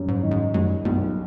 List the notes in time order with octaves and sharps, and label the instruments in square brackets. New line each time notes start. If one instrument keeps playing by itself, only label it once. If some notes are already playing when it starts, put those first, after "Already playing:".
Already playing: [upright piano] F#2 G3
[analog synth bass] G#2
[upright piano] D#3
[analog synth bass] G#2
[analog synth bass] F#2 [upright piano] G3
[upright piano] B1 [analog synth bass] G2